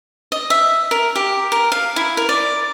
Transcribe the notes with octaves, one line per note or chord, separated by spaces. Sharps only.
D#5
E5
A#4
G4
A#4
F5
E4
A#4
D5